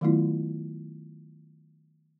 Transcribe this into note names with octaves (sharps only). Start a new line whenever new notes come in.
D#3 F#3 A3 B3 E4 F4